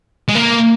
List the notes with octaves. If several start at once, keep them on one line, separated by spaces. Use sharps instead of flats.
G#3
A#3